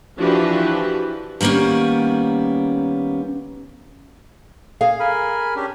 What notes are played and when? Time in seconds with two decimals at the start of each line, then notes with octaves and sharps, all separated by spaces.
0.17 E3 F3 D4 F#4 G4 B4
1.41 D#3 G3 A#3 B3 C#4
4.81 G#4 F5
5.00 A#4 G#5 B5
5.56 C#4 D4 G4